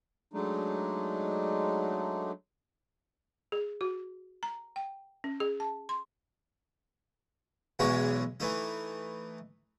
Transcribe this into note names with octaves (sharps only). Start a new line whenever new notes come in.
F#3 G#3 A3 D4 D#4
G#4
F#4
A#5
G5
C#4
G#4
A5
C6
B1 E2 E3 G#3 C#5 A#5
E3 A3 D#4